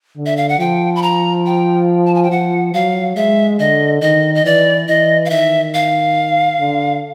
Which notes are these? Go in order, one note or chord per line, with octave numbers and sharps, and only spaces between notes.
D3
E5
F5
F#5
F3 G5
B5
A#5
G5
A5
G#5
G5
F3 F#5
F#3 F5
G#3 E5
D3 D#5
D#3 D#5
D#5
E3 D5
E3 D#5
F5
D#3 E5
F5
D3